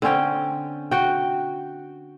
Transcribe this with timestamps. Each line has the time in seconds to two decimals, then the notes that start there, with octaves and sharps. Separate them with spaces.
0.02 D3 C4 C#4 G5
0.91 F#4 G5